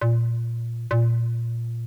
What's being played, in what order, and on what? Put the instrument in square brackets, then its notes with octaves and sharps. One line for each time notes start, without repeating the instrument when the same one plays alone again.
[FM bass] A#2
A#2